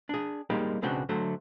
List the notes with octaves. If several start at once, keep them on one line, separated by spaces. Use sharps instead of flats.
D4 G#4
G3 G#3 A#3 C4 D#4 G4
B1 C#3 C4 D4 F#4 G5
D3 F#3 A3 C5